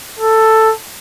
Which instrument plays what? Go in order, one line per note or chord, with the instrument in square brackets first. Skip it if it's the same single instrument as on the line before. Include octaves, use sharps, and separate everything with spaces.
[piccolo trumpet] A4